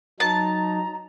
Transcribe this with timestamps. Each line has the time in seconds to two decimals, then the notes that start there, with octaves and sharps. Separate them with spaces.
0.20 F#3 D#4 A5 A#5